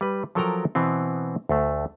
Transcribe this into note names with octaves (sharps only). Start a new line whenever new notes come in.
G3 B4
F3 F#3 A4 A#4 G5 A#5
B2 E3 B3 C4
D2 A3